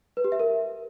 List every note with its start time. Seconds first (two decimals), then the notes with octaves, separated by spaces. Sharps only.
0.17 B4
0.24 G4
0.32 E5
0.40 A#4